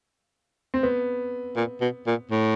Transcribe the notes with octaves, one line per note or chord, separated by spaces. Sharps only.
C4
B3
A#2
B2
A#2
A2